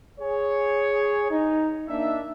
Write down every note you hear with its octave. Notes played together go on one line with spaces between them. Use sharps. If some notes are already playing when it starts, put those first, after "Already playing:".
G#4 C#5
D#4
A#3 D4 D#4 E5